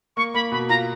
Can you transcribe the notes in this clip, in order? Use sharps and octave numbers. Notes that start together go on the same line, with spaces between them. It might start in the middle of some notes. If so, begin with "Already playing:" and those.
A#3 C#6
A#3 B5
B2 B5
F4 A#5